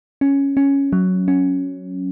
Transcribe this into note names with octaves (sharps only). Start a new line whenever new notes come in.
C#4
C#4
F#3
C#4